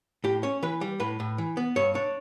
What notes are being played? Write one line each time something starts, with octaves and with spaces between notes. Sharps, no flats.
A2 G4
C#4 C#5
E3 B4
G3
A2 B4
A2
E3
B3
G2 C#5
D4 C#5